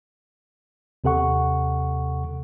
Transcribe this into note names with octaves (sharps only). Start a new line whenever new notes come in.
D#2 C3 A4 F#5 C#6